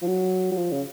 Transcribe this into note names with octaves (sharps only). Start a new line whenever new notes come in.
F3
F#3
F#3
F3
C#3